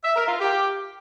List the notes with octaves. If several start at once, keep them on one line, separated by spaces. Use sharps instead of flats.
E5
A#4
F4
G4